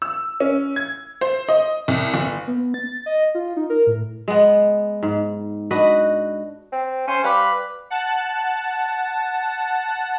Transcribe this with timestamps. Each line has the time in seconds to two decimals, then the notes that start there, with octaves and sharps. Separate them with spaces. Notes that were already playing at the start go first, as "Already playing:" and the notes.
0.02 E6
0.40 C#4
0.76 G#6
1.21 C5
1.49 D#5
1.88 C2
2.14 G1
2.47 B3
2.74 A6
3.06 D#5
3.35 F4
3.57 D#4
3.70 A#4
3.87 A2
4.28 G#3 B3
5.03 G#2
5.71 D4 F#4 B4 D#5
6.72 C4
7.08 C#4 C5
7.24 G3 B4 F5 D6
7.90 F#5 A5